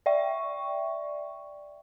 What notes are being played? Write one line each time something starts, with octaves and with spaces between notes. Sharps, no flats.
D5 E5 G5 C#6